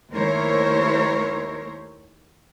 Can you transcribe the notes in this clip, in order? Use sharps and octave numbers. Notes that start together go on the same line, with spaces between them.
D#2 A3 E4 A#4 C5 C#5